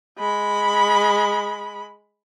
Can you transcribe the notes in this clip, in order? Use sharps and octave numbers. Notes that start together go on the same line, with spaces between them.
G#3 B5